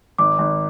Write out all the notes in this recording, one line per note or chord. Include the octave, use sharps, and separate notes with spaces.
G#1 D6
G#1